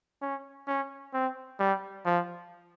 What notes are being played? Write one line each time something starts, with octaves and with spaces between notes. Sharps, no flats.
C#4
C#4
C4
G3
F3